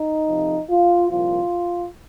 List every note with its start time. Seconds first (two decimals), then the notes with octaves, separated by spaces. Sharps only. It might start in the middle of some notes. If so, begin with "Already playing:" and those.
Already playing: D#4
0.26 F2 C3 F3
0.69 F4
1.10 C2 A#2 F3 F4